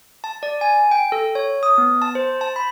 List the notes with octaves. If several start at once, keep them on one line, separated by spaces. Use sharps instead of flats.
A5
D5
G#5
G5
A4
C#5
D#6
B3
A5
C5
A5
B5